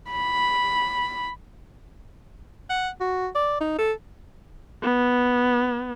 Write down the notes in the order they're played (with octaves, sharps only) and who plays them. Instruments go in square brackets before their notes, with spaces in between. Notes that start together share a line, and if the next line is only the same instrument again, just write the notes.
[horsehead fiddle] B5
[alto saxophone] F#5
F#4
D5
D#4
A4
[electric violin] B3